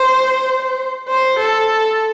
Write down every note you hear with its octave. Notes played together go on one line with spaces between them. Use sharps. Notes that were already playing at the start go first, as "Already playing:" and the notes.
Already playing: C5
C5
A4